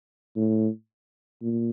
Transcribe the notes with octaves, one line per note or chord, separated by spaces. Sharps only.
A2
A#2